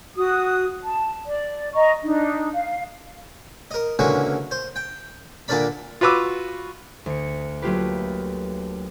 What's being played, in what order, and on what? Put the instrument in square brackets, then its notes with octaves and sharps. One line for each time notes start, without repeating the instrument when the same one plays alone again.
[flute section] F#4 D#6
A5
D5
D#5 A#5 C#6
D4 D#4
F5
[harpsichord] A#4 D#5
C#2 D3 E3 F#3 A#3 C#6
C5
G5
A#2 D3 D4 A#4 D5 B5
[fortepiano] F4 F#4 B4 D6 E6
[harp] D2 C#7
F#3 A3 A#3 F4 G4 B4